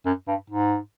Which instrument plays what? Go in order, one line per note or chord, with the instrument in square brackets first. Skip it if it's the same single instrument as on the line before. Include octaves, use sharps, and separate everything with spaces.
[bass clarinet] F#2
G2
G#2